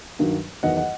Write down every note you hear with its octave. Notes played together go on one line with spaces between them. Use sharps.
G2 D#3 F#3
E2 D#3 F#3 D#5 F#5
D#5 F#5